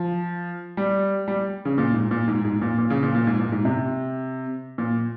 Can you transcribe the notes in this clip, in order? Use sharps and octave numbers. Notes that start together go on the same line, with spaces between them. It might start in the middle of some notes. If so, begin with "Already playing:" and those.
Already playing: F3
G3
G3
C#3
A#2
G#2
A#2
G#2
G#2
A#2
A#2
C#3
A#2
A#2
G#2
A#2
G#2
C3
A#2